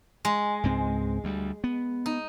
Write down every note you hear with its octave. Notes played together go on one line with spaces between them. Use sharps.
G#3
C#2 G#2 C4
D2 G3
B3
D#4